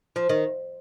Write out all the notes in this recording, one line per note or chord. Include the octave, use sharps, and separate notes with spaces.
F3
D#3